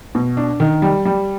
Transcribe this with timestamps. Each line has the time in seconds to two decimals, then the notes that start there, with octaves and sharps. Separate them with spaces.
0.15 B2
0.37 D4
0.60 D#3
0.82 G3
1.05 G3